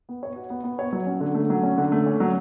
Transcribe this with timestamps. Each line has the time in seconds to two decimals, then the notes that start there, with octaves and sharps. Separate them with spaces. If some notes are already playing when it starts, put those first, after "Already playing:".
0.09 B3
0.23 C#5
0.36 F#4
0.50 B3
0.64 B3
0.79 C#5
0.92 F#3
1.07 C#4
1.20 D3
1.35 A3
1.50 F#3
1.63 C#4
1.78 D3
1.92 A3
2.06 C#4
2.20 F#3